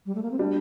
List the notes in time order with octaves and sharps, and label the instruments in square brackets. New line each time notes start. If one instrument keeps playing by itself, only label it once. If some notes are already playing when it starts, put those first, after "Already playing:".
[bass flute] G3
A3
A#3
C4
[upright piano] G3 [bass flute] D4